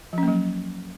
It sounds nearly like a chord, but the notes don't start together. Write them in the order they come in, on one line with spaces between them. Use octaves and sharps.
F3 C#4 A#3 F#3